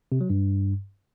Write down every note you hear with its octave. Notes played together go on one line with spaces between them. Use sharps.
C3
F#3
G2